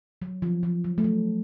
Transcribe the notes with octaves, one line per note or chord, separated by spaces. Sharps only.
F#3
F3
F3
F#3
A3
F#3